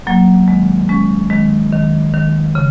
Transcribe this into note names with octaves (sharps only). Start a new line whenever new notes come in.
F#3 A#3
D#3 G#3
G#3 C#4
D#3 G#3
D#3
D#3
C#3